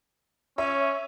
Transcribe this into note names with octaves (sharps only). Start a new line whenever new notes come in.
C#4 C#5 E5